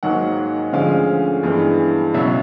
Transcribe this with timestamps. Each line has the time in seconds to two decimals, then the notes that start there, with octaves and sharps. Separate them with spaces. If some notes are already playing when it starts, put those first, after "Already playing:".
0.03 G#2 D#3 F#3 A#3 F#5
0.73 D2 D3 F3 G#3 C#4 F5
1.43 G2 E3 G#3 B3
2.14 C#2 B2 F#3 E5